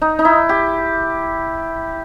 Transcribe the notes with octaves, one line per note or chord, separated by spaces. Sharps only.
D#4
D#4
E4
G4